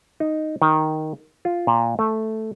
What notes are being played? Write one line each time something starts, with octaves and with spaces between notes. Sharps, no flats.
D#4
D#3
F4
A#2
A3